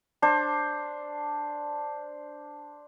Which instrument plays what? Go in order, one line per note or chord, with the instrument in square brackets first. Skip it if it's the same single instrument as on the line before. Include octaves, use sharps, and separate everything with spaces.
[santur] D4 C5